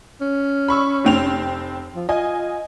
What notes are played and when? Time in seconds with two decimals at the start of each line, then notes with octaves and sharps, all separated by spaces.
0.21 C#4
0.68 B5 C#6 E6
1.05 F1 C4 F7
1.96 F3
2.09 F4 D#5 G#5